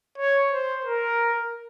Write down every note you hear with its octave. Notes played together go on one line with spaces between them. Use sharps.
C#5
C5
A#4